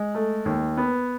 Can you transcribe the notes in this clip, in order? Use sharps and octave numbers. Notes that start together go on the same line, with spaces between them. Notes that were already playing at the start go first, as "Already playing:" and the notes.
Already playing: G#3
A3
D#2
B3